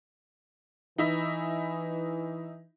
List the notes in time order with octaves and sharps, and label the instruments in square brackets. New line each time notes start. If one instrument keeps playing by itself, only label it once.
[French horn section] E3 [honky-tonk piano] D#4 E4 E5